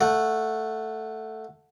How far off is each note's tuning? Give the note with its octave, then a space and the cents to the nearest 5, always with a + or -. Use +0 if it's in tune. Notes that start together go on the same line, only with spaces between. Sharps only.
A3 +5 F#5 -10